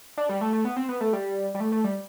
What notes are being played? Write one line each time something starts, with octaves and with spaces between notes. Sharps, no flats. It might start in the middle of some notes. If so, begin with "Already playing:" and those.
D4
G3
A3
A3
B3
C4
B3
A3
G3
G3
A3
A3
G3